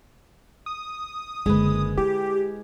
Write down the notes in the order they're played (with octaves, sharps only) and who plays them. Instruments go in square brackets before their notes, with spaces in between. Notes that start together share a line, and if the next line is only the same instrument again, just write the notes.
[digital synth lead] D#6
[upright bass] F#1 D3 [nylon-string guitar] G#3 B4
[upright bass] E4 [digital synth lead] G4